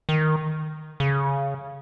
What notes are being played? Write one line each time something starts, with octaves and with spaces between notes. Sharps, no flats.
D#3
C#3